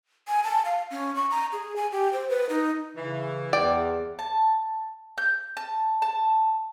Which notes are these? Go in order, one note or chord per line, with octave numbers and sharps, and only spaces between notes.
G#5
A5
F5
C#4
C#6
A#5
G#4
G#5
G4
C5
B4
D#4
C#3 E3
E2 D5 G5
A5
G6
A5
A5